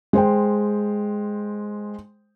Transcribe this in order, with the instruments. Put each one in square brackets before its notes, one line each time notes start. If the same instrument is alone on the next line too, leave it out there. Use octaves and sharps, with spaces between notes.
[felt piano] G#3 C5 G5